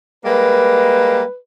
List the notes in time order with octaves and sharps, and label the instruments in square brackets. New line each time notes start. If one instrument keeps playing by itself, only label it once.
[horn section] G3 G#3 A#3 [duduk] B4